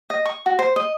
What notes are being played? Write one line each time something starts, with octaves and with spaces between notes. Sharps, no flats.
D#5
C#6
F#4
C5
D#5